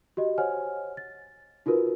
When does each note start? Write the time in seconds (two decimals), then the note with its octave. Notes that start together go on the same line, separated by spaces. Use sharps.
0.17 F#4 G4 D#5
0.38 C5 C#5 F#5 G#5 F6
0.97 A6
1.66 D#4 F4 F#4 A#4 B4